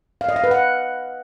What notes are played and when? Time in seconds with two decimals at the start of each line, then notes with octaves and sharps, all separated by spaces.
0.21 F5
0.29 D#5
0.36 F5
0.44 B4
0.51 F#5